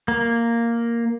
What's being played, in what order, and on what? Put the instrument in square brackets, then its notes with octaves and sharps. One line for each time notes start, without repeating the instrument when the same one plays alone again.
[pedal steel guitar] A#3